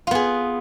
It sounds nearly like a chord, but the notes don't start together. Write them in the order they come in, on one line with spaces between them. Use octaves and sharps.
F4 B3 G#4